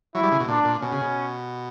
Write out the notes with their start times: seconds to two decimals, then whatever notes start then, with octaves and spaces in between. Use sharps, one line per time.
0.15 F#3 E4
0.23 G3
0.31 C#3
0.40 B2
0.48 A#2 D4
0.65 A#2
0.82 B2 C#4
0.92 C#3
1.01 B2